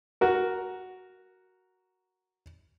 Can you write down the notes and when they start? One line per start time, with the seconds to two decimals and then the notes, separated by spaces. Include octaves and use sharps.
0.21 F#4 A#4